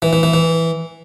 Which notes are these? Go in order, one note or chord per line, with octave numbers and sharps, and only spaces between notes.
E3
E3
E3
E3